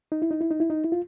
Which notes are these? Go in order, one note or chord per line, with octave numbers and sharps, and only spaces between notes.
D#4
E4
D#4
E4
D#4
E4
D#4
E4
F4